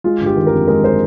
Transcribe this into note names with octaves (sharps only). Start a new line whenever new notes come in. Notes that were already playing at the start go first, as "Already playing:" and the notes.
G#3 F4
G1
G4
D#3
A#4
F2
G#3 A#4
C5